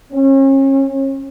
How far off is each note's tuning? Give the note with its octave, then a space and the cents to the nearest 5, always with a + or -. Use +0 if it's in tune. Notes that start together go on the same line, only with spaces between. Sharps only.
C#4 -35